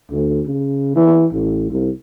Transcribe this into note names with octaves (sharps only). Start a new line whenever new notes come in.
D2
C#3
E3
A1
C2